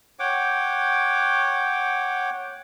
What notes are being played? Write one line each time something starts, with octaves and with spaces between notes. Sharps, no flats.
C#5 F#5 G5 D6